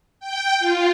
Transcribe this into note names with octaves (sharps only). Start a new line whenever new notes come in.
G5
F4